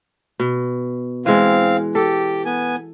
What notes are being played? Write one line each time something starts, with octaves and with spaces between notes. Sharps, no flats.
B2
E3 G#3 C4 F5
G4 A4
B3 G#5